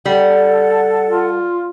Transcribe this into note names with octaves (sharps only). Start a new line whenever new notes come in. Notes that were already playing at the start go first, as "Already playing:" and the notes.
G3 A4 F#5
F4